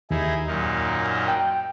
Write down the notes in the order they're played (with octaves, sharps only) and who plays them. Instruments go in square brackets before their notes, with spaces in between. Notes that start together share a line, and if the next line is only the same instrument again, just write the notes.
[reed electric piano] D#2 [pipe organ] D#4 E4 G#4
[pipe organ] F#2 A#2 D#4
[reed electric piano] G5